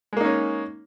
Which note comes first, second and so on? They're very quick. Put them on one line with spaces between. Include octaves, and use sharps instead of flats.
G#3 A#3 D#4 C#4